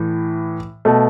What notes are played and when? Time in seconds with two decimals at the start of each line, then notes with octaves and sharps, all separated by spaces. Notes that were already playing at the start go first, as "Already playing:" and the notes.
Already playing: A2 E3
0.85 B2 A3